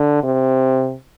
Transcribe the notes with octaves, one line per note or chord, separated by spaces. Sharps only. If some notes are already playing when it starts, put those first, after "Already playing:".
Already playing: D3
C3